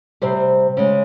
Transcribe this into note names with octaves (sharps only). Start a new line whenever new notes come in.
C3 G3 C5
C#3 G#3